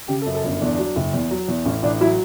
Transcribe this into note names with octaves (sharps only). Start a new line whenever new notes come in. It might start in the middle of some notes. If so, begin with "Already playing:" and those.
C#3 G4
A4
F#2
A4
G1 C#4
E2 D4
F#3
F#1
E2
F#3
E2
A1 C#4
A1 D4
F#3 E4